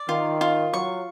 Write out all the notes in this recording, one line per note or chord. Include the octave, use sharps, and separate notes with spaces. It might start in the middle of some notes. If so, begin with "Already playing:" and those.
Already playing: D5
D#3 F4
F4
F#3 C#6